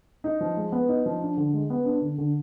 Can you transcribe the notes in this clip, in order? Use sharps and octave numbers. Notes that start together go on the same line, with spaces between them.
D#4
F3
G#3
B3
D#4
F3
D4
D3
G#3
B3
D4
D3
D3